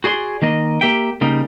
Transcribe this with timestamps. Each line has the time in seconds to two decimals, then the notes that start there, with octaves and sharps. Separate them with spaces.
0.04 F#4 G#4 D5 C6
0.42 D#3 A#3 D#5
0.81 A#3 G4 E5 G5
1.21 C#3 G3 A#3 D#4